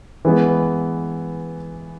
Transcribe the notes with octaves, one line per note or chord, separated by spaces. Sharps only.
E3 G#3 B3